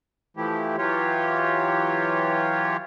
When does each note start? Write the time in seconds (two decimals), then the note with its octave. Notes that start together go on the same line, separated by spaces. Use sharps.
0.37 E3 F3 A3 E4 G4
0.78 E3 F#3 F4 G4 C#5